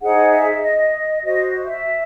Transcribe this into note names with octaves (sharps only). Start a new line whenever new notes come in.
D#4 G#4 C5 F#5
E5
D#5
F#4 C5 D#5
E5